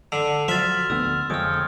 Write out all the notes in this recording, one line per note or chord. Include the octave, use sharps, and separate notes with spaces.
D3 E6
F3 F#3 E5 C6 F6 A6
D2 D3 B3 E6
F2 D3 F3 G#3 C#5 G5 D#6 F6